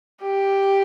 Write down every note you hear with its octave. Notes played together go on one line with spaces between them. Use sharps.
G4